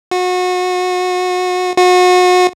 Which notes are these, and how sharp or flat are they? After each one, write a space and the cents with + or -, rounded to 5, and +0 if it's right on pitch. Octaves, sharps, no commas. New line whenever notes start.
F#4 -30
F#4 -35